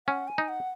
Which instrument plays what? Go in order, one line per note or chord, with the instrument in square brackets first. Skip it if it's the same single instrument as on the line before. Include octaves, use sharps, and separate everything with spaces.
[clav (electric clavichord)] C#4 [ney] F#5
[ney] G#5
[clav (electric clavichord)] D#4
[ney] F#5